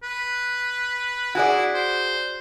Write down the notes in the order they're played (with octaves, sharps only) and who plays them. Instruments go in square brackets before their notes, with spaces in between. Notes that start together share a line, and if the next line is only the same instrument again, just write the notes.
[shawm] B4
[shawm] E4 [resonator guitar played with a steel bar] F#4 G#4 D5
[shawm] C5